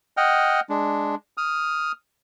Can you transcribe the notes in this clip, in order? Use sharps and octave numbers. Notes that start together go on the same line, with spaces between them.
D#5 F#5 G5 F6
G#3 D4
D#6 F6